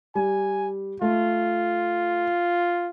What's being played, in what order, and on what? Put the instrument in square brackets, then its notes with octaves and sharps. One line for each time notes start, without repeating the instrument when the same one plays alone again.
[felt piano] G3 [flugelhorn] G#5
[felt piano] A3 [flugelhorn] F4